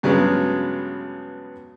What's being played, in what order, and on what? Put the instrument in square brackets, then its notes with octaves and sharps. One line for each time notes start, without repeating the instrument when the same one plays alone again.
[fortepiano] G2 C#3 F#3 G#3 B3